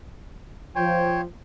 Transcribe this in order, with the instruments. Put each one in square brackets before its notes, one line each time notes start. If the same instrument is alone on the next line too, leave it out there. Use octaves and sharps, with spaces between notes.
[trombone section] F3 [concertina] C5 C#5 [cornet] G5